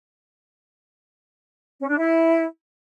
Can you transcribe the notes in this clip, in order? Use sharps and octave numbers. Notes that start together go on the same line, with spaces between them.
C#4
D4
E4